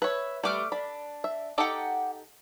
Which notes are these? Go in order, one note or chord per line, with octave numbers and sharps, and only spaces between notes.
B4 C#5 E5
G3 A3 B4 D6 F6
D4 B5
E5
D#4 G4 A4 F#5 G5 D6